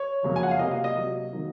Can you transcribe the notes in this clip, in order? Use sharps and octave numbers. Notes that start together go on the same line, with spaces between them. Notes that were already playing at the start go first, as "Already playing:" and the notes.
Already playing: C#5
F2 C#3 F#3 A#3
G#5
F#5
F5
C3 F#3 A#3 D#5
F5
D#5
C3 F#3 A#3
D#3 F#3 A#3